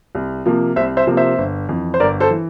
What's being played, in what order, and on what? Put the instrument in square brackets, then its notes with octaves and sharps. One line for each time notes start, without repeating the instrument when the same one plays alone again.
[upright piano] C2
C3 F3 A#3
C2 C5 E5
C5 E5
C3 F3 A#3
C5 E5
G1
F2 E3
C5
G1 A#4 D5
A4 C5
E3